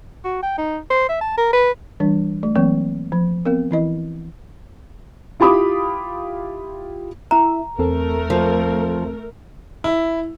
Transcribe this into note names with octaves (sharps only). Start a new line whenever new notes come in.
F#4
G5
D#4
C5
E5
A5
A#4
B4
E3 G3 D4
A3
E3 F#3 A#3 C4
F3
B3 C4 A#4
E3 E4 D#5
E4 F4 G4 B5 D6 D#6
E4 E5 A#5
E2 A3 C4 A4 A#4
F3
E4